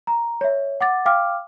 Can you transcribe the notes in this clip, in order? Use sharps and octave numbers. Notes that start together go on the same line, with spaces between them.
A#5
C#5 E5
F#5 D6 A6
F5 G5 D6 F6